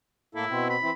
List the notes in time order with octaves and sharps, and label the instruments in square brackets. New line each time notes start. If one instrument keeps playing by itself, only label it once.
[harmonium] A2 A#3 A4 [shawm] E4
[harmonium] B2 C4
[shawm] B5
[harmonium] E3 C4 E4